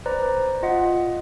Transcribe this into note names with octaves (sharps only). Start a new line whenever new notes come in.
B4 C5 D5 A#5
F4 D#5 F#5